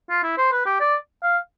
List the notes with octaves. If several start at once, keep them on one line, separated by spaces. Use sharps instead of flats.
F4
E4
C5
B4
G4
D5
F5